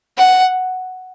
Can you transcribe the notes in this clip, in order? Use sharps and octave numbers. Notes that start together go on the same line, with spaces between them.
F#5